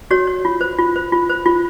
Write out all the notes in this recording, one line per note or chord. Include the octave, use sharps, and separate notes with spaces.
F#4 C#5
C#5
F4
C5
F4
C5
F4
C5
F4